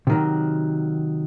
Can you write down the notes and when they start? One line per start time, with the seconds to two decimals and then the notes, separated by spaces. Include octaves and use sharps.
0.07 C3 D#3 F#3